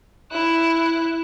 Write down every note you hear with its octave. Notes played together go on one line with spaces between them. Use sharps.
E4 F#6